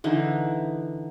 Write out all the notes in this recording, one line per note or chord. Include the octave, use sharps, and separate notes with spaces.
D3 E3 D#4